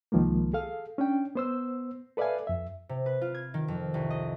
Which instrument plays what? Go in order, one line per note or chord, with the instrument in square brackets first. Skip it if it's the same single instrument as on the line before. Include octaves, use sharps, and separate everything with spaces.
[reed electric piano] C2 D#3 F3 G#3 A#3
G#4 A4 F5
C#4 D4 G5
B3 C5 E6
A4 B4 D5 E5 F5 G#5
F2 E5
[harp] C3
B4
F4
G#6
D#3
F2
C2
D#5